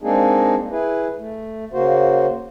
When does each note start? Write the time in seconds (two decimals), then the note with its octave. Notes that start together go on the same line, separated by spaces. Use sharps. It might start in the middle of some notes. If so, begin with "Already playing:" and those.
0.02 G#3 A#3 C4 D4 D#4 G#4
0.71 E4 G#4 B4
1.17 A3
1.73 C#3 A#3 F#4 C5